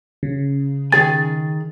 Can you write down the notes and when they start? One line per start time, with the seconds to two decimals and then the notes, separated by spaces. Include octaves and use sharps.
0.23 C#3
0.92 D#3 G#4 G#5 A6